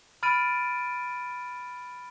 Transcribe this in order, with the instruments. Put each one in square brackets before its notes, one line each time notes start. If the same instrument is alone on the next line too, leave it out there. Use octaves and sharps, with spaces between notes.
[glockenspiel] B5 F6 A6 D7 D#7